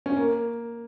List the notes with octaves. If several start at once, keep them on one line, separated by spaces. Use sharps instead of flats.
C#4
A#3